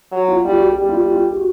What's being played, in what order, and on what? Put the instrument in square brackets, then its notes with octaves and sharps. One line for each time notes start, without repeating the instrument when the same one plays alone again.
[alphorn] F#3
[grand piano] F4
[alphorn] G3 [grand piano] F4
[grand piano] F#4
G4
[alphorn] G3 [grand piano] G4
[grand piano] F4
F4
F4
G4
F#4